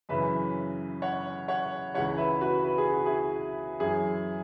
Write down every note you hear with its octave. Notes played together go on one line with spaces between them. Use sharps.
F#2 C#3 E3 B4 E5
C#5 F#5
C#5 F#5
C#2 C#3 E3 C#5 F#5
B4 E5
F#4 B4
B4
G#4
F#4
E4 G#4
F#2 E3 E4 G#4